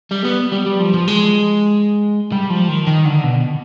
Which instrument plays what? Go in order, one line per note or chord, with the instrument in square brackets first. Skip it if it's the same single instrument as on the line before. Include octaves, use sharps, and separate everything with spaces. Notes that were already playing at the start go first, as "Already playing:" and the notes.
[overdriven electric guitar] G3
B3
G3
G3
F3
F3
G#3
G3
F3
D#3
D#3
D3
B2